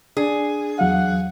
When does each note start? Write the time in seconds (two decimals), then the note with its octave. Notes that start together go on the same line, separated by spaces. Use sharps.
0.17 D4 G#4
0.79 E2 F#3 F5 F#5